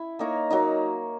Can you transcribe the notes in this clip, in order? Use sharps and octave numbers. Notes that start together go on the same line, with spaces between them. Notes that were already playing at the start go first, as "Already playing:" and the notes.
Already playing: E4
A#3 D#4 A#4 C#5
F#3 A#3 D#4